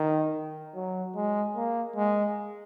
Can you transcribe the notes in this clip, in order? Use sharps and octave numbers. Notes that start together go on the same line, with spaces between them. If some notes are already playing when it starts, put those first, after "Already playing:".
Already playing: D#3
F#3
G#3
A#3
G#3